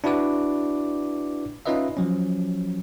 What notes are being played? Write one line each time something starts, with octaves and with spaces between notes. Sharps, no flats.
D4 E4 F#4 B4 D5 D6
C#4 D#4 F4 B4 D#5 E5
F3 F#3 C#4